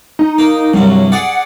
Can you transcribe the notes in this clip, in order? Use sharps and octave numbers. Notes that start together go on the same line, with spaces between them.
D#4
A#3
C2 G2 F#3
G#4 D5 F#5